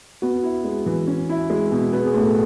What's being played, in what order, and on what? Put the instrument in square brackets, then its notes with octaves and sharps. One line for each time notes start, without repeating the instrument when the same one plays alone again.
[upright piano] B3 [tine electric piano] F#4
[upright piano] E4
G#3
E3
C#4
E4
G#3
B2
[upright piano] B3 [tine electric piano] G#4
[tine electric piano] G#4
[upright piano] A2
[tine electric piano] A4